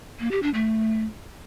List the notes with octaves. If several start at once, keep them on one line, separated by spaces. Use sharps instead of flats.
A#3
G4
D4
A3